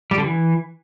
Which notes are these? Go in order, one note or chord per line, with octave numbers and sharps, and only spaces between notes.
G3
D3
E3